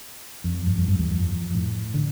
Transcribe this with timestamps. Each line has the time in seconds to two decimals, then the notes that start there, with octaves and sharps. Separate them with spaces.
0.44 F2
0.67 G2
0.78 F2
0.88 G2
0.99 E2
1.11 F2
1.55 A2
1.94 D3